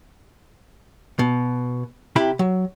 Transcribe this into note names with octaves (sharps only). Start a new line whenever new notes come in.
B2
C3 E4 G4 B5
F#3